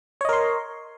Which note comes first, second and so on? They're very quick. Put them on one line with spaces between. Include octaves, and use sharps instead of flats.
C#5 D#5 A#4 C6